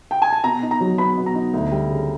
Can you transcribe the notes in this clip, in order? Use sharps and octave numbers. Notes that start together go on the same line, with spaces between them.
G5
G#5
A5
B2 A#5
D#4
A#5
F#3
B3 B5
B2
A#5
D#4
D2
G3
C#3